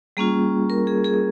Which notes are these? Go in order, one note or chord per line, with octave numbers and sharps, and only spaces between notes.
G3 A#3 C#4 F4 G#4
A#4
G#4
G#4